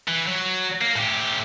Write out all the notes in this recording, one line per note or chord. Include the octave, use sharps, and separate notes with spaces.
E3
F#3
A#3
A2 G4